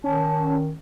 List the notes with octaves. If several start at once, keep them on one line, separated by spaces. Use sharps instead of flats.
D#3 C#4 A5